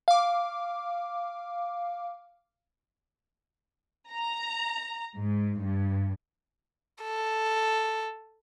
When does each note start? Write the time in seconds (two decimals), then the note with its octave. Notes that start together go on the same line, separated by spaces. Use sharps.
0.08 F5 D6
4.10 A#5
5.16 G#2
5.64 G2
7.03 A4